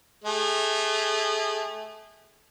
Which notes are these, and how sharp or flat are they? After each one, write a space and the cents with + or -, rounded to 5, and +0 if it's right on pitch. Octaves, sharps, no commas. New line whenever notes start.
A3 -25 G#4 -35